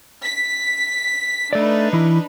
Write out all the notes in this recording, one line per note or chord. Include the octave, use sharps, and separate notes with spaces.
B6
A3 D4 D#4 B4 D5
E3 E4